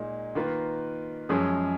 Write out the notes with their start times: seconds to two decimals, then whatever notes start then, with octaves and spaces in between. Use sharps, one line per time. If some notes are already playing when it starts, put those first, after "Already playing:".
Already playing: A#2 G#3 D#4
0.35 D#3 A#3 F4 B4
1.29 F#2 F3 G#3 C#4 G#4